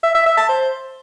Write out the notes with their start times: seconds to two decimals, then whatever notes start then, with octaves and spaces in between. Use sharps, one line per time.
0.03 E5
0.15 E5
0.26 E5
0.37 A5
0.49 C5